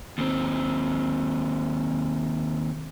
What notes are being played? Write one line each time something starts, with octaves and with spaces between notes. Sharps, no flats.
D#2 C4